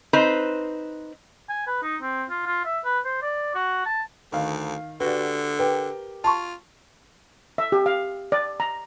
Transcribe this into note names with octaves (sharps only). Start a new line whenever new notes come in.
C4 D#4 B4 C5
G#5
B4
D#4
C4
F4
F4
E5
B4
C5
D5
F#4
A5
D2 D#3 F5
D3 F#4 G4 B4 D5
G4 A#4 B4 G5
F4 A5 C6 C#6
E5
G4
F5
D5
A#5